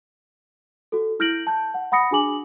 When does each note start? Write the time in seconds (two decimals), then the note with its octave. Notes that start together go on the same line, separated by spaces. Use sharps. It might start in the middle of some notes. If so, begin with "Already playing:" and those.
0.92 F#4 A4
1.20 E4 F6 G6 A#6 D7 F#7
1.47 A5 G6
1.74 F#5
1.92 F#5 B5 D#6 A#6 C#7
2.11 D4 F#4 G#4 G#5 D6 F#7